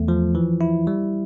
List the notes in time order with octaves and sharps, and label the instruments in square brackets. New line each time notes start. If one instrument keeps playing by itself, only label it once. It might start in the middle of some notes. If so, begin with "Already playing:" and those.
Already playing: [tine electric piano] E2 A3
F3
E3
E4
G3